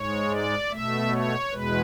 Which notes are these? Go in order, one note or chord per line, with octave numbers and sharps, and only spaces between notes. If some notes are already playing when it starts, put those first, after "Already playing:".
Already playing: G#2 G#3 C#5
D5
B2 A3 E5
C#5
E2 B2 G#3 B4